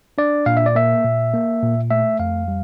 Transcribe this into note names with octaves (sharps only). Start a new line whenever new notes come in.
D4 D5
A#2 F5
E5
D5
A#3 E5
A#2
A#3
A#2
A3 E5
F2 F5
G3